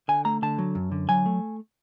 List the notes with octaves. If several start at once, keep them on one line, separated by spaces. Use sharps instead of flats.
D3 G#5
A3 A#5
D3 A5
F#3
F#2
D3
F#3 G#5
A3